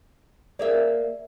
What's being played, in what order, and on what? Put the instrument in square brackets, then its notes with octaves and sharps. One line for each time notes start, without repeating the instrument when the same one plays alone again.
[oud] A#3 G#4 E5 [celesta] A#4 D5